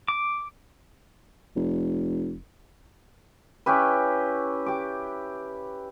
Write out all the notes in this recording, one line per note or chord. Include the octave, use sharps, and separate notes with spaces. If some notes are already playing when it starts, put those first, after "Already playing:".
D6
F1
C#4 E4 G4 B4
G4 D6